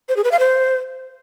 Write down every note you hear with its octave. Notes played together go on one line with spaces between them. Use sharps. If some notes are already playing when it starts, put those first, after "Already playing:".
C5
G#4
B4
F5
C5